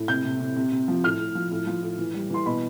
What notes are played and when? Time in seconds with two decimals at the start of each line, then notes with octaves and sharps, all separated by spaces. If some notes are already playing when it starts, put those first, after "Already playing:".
Already playing: A2
0.08 C3 G6
0.25 C3
0.40 C3
0.56 C3
0.72 C3
0.88 F3
1.04 A2 F6
1.20 A2
1.35 F3
1.51 A2
1.67 F3
1.82 A2
1.98 E3
2.14 G3
2.30 E3 C6
2.46 B2 B5